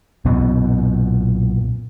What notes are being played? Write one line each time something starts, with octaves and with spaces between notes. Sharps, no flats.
B1 F#2 A#2 E3 B3